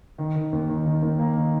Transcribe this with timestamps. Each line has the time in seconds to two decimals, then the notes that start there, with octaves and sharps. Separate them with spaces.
0.18 D#3
0.35 D#3
0.53 D#2
0.69 D#3
0.86 D#3
1.02 D#2
1.19 A#3
1.36 D#3